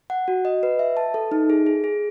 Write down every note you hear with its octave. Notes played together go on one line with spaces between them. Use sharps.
F#5
F#4
D#5
B4
E5
A5
A4
D#4
G#4
G#4
G#4